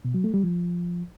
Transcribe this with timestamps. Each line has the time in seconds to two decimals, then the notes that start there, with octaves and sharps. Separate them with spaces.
0.05 B2
0.14 F#3
0.24 A3
0.34 G3
0.43 F3